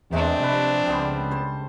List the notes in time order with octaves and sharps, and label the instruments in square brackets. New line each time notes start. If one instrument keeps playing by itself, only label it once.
[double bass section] E2 [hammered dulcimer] C3 G#3 A3 [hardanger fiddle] C4 D4
[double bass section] C3 F3 [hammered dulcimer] B4
[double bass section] C#2 C#3 [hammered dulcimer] G3 B3 C5
[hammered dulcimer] C5 A5